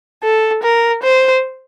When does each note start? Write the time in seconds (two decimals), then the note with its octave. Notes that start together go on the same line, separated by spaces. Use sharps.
0.24 A4
0.63 A#4
1.03 C5